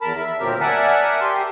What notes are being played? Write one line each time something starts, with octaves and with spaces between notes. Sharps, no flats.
E2 A#4 A5 B5
E5
D2 A#2 F#3 C4 G4 A#4
A#4 D5 E5 F#5 G#5 A5
G4 C6